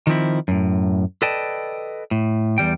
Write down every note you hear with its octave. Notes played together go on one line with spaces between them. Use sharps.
D#3 F3 C4 E4
F#2 A2
A4 B4 D5 D#5 G5 A5
A2
E2 F#3 G3 G5